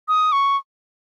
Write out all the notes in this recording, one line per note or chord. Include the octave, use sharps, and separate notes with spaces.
D#6
C#6